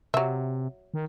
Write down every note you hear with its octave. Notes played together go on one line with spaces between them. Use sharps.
C3 F#3 E5
D#3